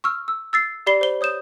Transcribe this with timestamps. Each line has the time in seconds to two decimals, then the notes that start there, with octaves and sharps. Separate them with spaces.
0.04 C#6 E6 F6
0.28 E6
0.53 E6 A6 C7
0.87 G4 D5 B5 C7 G7
1.01 C5 G7
1.21 C#5 D#6 G6 E7